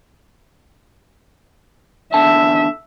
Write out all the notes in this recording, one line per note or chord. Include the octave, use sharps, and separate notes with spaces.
E2 D3 E5 A5